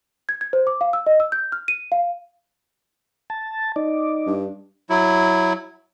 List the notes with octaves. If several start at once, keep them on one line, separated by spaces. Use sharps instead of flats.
G#6
G#6
C5
D6
F5
E6
D#5
E6
G6
F6
D#7
F5
A5
D#4 D5
G2
F#3 E4